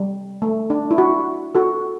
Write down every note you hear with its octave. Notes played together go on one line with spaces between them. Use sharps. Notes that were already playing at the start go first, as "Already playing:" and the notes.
Already playing: G3
A3
D4
E4
F#4
F#4 A4